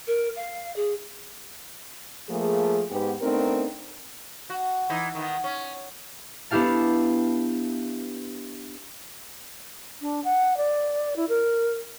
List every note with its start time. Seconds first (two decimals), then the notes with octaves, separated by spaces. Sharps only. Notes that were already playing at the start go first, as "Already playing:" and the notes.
0.07 A#4
0.36 F5
0.76 G#4
2.29 F3 A3 A#3 G#4
2.91 G#2 B3 G4
3.22 A3 B3 C4 D4 D#4 A#4
4.50 F#4
4.90 E3 D#4
5.15 D#3 B3
5.44 C#4
6.50 B3 D4 E4 G4 F5 A5
10.02 D4
10.24 F#5
10.57 D5
11.16 E4
11.29 A#4